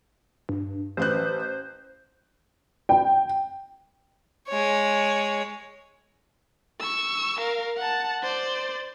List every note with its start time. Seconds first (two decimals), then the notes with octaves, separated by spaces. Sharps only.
0.49 G2
0.97 A1 B4 C5 F#6
2.89 G5
4.48 G#3 C#5
6.80 C#6 E6
7.40 A#4 F5
7.77 F#5 A5
8.23 C5 D5